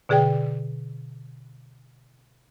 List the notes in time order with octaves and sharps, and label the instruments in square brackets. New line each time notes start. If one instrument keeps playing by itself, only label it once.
[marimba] B2 D3 G#4 D5 G5